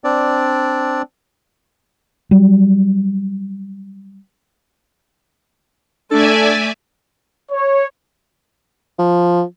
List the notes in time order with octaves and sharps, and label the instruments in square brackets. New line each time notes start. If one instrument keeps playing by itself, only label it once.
[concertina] C4 D4 D5
[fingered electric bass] F#3 G3
[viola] A3 [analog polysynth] D4 [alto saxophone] A4 [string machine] D5 E5 G#5
[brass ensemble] C#5
[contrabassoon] F3